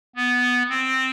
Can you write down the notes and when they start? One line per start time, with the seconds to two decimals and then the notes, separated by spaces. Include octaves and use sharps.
0.16 B3
0.69 C4